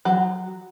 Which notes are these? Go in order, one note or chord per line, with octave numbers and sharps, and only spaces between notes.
F#3